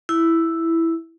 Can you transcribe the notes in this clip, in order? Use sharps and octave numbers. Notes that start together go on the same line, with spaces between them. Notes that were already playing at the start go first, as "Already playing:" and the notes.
E4